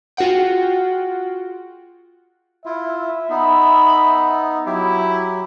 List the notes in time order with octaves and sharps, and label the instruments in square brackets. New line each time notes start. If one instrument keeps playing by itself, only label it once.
[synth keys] F4 F#4 G#4 F#5 G5
[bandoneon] E4 F4 [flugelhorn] E5
[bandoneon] B3 D#4 [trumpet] B5
[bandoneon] F#3 G4 [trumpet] E4